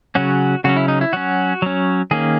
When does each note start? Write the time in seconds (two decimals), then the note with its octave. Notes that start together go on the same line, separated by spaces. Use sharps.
0.15 C#3 F#3 C#4 F#4
0.64 C#3 F#3 C#4 F#4
0.76 E4
0.88 D#4
1.01 E4
1.13 F#3 C#4 F#4
1.62 F#3 C#4
2.11 D#3 A#3 C#4 G#4